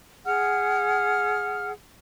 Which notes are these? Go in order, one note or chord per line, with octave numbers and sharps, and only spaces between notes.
G#4 F#5 F6